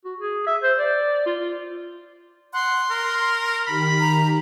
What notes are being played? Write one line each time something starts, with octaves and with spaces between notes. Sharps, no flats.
F#4
G#4
E5
C5
D5
F4
F#5 C6
A#4
D#3 G4 B5
A#5